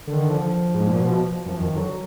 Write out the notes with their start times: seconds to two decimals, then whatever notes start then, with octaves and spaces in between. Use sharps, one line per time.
0.07 D3 D#3
0.30 F3
0.74 G#2
0.87 A#2
1.00 B2
1.46 F#2 F3
1.61 F2 D#3
1.76 D3 F#3